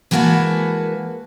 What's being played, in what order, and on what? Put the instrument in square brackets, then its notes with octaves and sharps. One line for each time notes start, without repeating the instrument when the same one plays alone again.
[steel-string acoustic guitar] E3 G#3 A#3 F#4 B4 A5